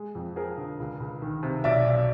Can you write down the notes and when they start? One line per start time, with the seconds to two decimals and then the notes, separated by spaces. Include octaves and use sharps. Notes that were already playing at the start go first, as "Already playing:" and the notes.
Already playing: G#3
0.15 F2
0.36 F3 G#4 A#4
0.57 D3
0.80 C#2
1.00 C#2
1.22 D#3
1.43 C3
1.64 B1 D5 E5
1.86 B1